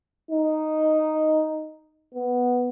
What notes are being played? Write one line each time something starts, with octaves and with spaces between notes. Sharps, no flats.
D#4
B3